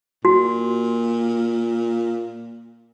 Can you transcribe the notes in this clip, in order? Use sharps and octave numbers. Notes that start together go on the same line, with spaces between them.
A#2 F#4